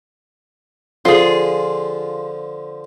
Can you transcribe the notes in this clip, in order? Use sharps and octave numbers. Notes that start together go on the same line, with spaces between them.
D3 F3 F4 G#4